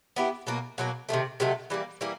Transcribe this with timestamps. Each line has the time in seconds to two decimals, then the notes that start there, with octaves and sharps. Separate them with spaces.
0.16 B3 E4 G4
0.47 B2 F#3 A#3
0.78 B2 F#3 A#3
1.09 C3 D#3 F#3 A3
1.40 C3 D#3 F#3 A3
1.70 E3 G3 A#3
2.01 E3 G3 A#3